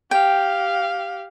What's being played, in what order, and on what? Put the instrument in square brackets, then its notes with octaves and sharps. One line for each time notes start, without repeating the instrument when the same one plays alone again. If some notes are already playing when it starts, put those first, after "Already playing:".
[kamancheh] G4 F5 [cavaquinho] G5